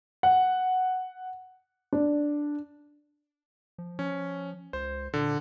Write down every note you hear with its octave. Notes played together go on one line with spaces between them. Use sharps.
F#5
D4
F3
F3 C#4
C#2 C5
A#2 D3